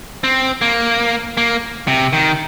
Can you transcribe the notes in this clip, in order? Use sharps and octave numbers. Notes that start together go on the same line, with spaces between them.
C4
A#3
A#3
C3
D#3